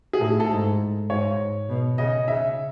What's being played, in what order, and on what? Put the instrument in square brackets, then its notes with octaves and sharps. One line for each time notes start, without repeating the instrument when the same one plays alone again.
[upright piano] G#4
[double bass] A2 [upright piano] A4
[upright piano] G#4
A4
[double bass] G#2
[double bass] G#2 [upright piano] C#5
[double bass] B2
[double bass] C#3 [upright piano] D#5
[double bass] C#3 [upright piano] E5